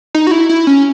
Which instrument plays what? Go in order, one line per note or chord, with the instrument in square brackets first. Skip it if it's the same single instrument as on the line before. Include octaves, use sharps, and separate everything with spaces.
[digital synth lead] D#4
F#4
E4
E4
C#4